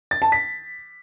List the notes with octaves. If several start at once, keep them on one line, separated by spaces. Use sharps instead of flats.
A6
A5
B6